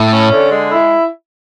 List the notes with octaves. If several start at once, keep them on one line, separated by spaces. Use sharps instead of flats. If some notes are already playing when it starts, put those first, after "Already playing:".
Already playing: A2 E4
C#4
D3
G#3
E4